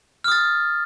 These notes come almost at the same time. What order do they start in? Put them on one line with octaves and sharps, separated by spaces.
F6 D#6 A6